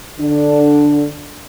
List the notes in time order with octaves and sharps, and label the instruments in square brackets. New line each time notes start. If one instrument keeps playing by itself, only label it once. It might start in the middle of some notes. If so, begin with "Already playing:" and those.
[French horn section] D3 D4